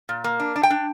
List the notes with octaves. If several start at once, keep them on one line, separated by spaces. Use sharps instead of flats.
A#2
A#3
D4
D4
G5
D4